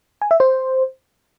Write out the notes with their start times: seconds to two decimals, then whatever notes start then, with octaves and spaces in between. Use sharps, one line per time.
0.22 G#5
0.31 E5
0.40 C5